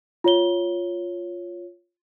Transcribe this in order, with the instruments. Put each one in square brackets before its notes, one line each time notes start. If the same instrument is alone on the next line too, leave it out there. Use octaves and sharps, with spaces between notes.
[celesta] F4 C#5 G7